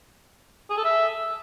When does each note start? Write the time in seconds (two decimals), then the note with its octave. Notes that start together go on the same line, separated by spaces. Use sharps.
0.70 G#4
0.77 A4
0.84 E5